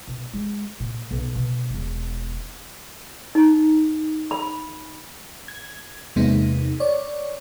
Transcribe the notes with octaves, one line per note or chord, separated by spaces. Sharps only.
B2
G#3
A#2
B1
B2
E1 B3
D#4
B5
G#6
E2 C3 G#3 A#3 B3 D#4
C#5 D5